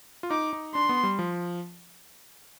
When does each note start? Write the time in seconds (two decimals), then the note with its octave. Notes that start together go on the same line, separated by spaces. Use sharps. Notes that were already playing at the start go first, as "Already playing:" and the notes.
0.23 F4
0.30 D#4 D6
0.53 D#4
0.75 D4 C6
0.89 B3
1.03 G3
1.19 F3